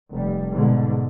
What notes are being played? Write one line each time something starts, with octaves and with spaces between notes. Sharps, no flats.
F1 G3
G#2 B2 D3